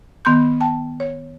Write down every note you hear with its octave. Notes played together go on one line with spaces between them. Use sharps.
D#3 B3 C6 G6
G5 A5
C#5